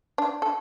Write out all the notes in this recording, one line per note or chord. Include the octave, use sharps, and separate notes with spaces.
D4
A4